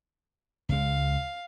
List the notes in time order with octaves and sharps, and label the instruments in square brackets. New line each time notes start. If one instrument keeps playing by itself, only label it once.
[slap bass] C#2 G#3 [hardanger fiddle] F5